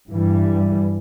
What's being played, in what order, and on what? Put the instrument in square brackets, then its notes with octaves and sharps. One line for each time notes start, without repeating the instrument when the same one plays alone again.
[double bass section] G2 E3 G3